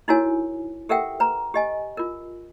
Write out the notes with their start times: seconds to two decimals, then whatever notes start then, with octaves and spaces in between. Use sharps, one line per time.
0.08 D#4 E4 F#4 A#4 C#5 G#5
0.89 G4 A4 A#4 E5 F#5 G5
1.20 B4 A#5
1.54 G4 D#5 G#5
1.97 F4 A#4